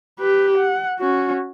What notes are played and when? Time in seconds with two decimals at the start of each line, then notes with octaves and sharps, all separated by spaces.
0.20 G4 B4
0.58 F#5
0.99 C#4 F#4